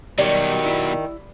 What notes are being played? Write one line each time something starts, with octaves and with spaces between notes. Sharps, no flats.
B2 D#3 F#3 G3 C#5 D5
E4